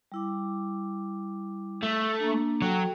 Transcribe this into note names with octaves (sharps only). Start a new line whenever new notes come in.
G3 E4 D6
A3
A#3 D4
F#3 F#4 A4 G5